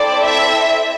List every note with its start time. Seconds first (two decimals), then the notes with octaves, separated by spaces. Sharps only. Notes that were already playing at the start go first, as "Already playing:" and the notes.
Already playing: C4 E4 A4 D5
0.25 E5